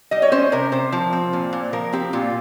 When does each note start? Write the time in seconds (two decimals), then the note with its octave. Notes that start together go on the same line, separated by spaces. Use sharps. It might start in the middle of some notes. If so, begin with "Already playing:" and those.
0.11 G3 D#5
0.22 C#5
0.32 C#4 C5
0.52 C3 A#4
0.72 C3 C5
0.92 F3
1.13 C4
1.33 A#2
1.53 A#2
1.73 F3 A#4
1.93 C4 G4
2.13 A#2 F4